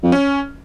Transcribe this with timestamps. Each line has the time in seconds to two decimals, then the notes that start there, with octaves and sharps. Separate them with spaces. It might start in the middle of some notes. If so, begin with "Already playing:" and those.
0.04 F2
0.12 C#4